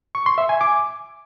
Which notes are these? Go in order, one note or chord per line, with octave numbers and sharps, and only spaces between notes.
C#6
C6
E5
G#5
D6